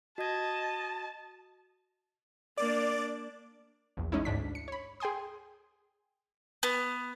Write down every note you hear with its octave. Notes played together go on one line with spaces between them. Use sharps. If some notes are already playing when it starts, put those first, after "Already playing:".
F#4 D#5 A5 G#6
A#3 D4 D5
A#1 E2
G#3 C#4 D#4 E4
D2 G#2 D4 B6
C#7
C#5 B5
G#4 G5 G#5 C6 D#6
B3